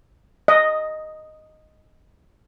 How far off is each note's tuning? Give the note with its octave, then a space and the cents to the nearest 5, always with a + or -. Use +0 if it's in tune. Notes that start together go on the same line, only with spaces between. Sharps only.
D#5 -5